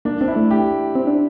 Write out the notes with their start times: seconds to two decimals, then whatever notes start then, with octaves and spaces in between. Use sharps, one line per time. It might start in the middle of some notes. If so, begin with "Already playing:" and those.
0.05 A#3 D4
0.21 C4 D4
0.28 E4
0.36 A3
0.51 G4
0.95 C4
1.07 D4